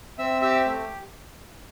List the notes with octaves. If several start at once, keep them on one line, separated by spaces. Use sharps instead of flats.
C4 E5 E6
G4 E5 E6
A3